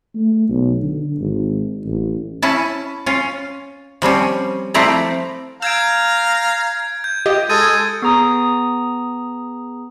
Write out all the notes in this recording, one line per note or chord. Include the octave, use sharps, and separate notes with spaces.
A3
B1
D3
G#1
A1
C#4 E4 A5
C#4 F4
F3 G3 C4 C#4
F3 A3 C4 E4 D5 A#5
F5 A#5 E6 G6 G#6 D7
G6
F4 G4 D#5
G#3 A4 D#6 G#6 A6 D#7
B3 G#4 A#5 D#6